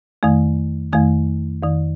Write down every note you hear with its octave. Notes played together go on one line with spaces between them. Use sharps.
F2 D#3 A3
F2 D#3 A3
F2 D#3